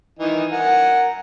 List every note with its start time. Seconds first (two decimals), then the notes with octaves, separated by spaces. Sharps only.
0.19 D#3 E3 D#4
0.52 A#4 F#5 G#5